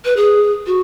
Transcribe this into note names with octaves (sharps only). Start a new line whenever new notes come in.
B4
G#4
F#4